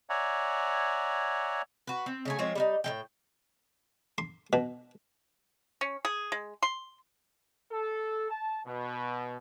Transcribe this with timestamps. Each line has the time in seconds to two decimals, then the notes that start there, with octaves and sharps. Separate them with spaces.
0.10 C#5 D5 E5 F#5 G#5 A#5
1.87 F#4 B4
2.06 C4
2.25 C#3 A3 G#5
2.39 F3 G#3 C4 C#5
2.55 G3 B3 D#4
2.84 A2 G#3 G5
4.18 C6
4.53 B2
5.81 C#4
6.05 G#4
6.32 G#3
6.63 C6
7.72 A4
8.31 A5
8.66 B2